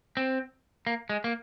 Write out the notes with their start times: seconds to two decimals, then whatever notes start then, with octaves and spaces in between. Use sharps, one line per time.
0.17 C4
0.87 A#3
1.09 G#3
1.24 A#3